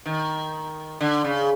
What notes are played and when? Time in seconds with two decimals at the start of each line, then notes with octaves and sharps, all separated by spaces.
0.06 D#3
1.01 D3
1.24 C#3